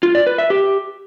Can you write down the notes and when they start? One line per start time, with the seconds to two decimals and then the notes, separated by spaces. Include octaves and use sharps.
0.03 F4
0.15 D5
0.27 B4
0.38 E5
0.50 G4